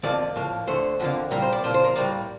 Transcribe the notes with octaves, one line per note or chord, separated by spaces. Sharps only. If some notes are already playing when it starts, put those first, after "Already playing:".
F2 D3 F3 A#3 D5
A2 F3 A#3
D2 D3 A3 C5
F2 D3 F3 A#3
A#2 G3 A#3 A#4
C5
D5
A#2 F3 A#3 C5
C5
A#4
A2 G3 A#3 D5